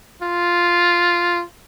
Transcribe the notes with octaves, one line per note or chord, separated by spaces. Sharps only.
F4